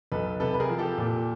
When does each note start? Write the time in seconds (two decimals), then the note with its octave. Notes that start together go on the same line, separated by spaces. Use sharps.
0.12 B1 A4 B4
0.40 C3 A4 B4
0.54 B4
0.60 G#4 A#4
0.69 F3
0.78 G4 A4
0.98 A#2